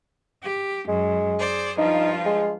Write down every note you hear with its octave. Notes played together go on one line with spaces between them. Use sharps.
G4
F#2 G#3
G#4 C5 D5
G2 F3 D#4 F4
G#3